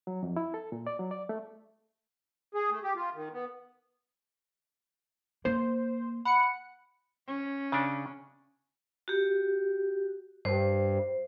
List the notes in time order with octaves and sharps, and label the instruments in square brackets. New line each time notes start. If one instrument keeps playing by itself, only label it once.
[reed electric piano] F#3
F2
E4
A4
A#2
D5
F#3
D5
A3
[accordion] G#4
A3
G4
F4
D#3
B3
[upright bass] A#3 [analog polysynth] C5
[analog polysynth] F#5 C#7 [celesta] B5
[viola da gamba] C#4
[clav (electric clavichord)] C#3 D4
[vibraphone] F#4 G4
[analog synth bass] G2 [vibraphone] C5